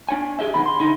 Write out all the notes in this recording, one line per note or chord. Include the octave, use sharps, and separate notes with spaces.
D4 C#5 G#5
G4 G#4 D#5 E5
B1 D#3 B3 B5
C6
D3 D#4 E4